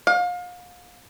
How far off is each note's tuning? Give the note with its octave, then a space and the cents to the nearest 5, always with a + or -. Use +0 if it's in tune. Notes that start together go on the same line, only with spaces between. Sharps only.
F5 +35